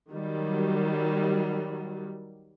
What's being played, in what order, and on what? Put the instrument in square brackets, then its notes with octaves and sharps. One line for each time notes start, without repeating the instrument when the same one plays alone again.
[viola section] D#3 F#3 G3